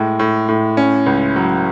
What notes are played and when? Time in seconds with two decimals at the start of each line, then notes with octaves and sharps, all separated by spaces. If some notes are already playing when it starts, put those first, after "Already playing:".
Already playing: A2 G#3
0.19 A2
0.49 A2
0.77 C#4
1.06 C#2
1.36 F#3